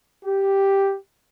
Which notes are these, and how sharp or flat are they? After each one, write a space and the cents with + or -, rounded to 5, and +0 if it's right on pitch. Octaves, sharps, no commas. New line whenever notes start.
G4 +0